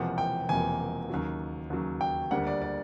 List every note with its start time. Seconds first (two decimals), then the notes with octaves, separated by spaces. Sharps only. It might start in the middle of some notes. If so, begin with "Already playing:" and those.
Already playing: E1 E2 C3 F3 A#3 F#5
0.18 G5
0.49 E1 E2 C3 F3 A#3 G#5
1.10 D#2 C#3 F#3
1.70 D#2 C#3 F#3
2.01 G5
2.31 D2 D3 G3 A#3 F#5
2.47 D5
2.62 D5